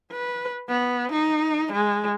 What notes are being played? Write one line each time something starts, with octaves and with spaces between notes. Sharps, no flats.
B4
B3
D#4
G#3